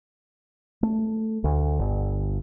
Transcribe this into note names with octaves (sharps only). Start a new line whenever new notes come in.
A3
D2
G1